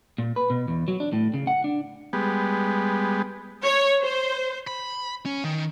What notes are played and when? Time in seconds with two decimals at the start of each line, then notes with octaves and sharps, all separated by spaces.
0.18 A#2
0.36 B4
0.50 B2
0.68 E2
0.88 F#3
1.00 D4
1.13 A2
1.34 C#3
1.47 F#5
1.64 D4
2.13 G3 G#3 B3
3.63 C#5
4.02 C5
4.67 B5
5.26 C#4
5.44 D#3